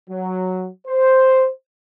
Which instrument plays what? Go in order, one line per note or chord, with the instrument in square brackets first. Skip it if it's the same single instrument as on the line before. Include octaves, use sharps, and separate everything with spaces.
[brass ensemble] F#3
C5